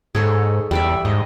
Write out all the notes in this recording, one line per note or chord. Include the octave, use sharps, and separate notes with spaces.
G#2 G#4 A4 C#5
E2 G3 D5 E5
G#2 D#5